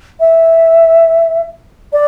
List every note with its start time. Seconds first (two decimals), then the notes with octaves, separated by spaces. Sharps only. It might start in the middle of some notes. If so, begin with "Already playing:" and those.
0.20 E5
1.93 D5